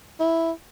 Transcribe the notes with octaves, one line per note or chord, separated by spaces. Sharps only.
E4